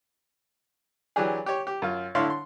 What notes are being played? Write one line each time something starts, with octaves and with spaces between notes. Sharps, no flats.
E3 F#3 D4 G4 G#4
G4 C#5
G4
F#2 F4
A2 D3 E4 C#5 F5 C6
C6